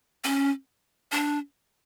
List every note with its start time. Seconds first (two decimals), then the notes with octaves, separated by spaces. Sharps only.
0.24 C#4
1.12 D4